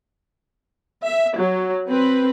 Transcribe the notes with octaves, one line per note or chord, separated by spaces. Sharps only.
E5
F#3
C4 B4